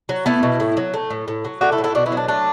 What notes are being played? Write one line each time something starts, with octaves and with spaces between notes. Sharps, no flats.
F#3
A3 B3 E4
B2
A2
F#3
A3
A2
A2
F#3
A3 D4 F#4
E4 A4
A2
E4 A4
B2 D4 F#4
B3 E4
F#3
D4
A3 D4